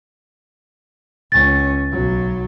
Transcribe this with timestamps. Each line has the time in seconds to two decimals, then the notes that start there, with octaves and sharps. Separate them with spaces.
1.32 C#2 C#4 A6
1.92 B1 F#3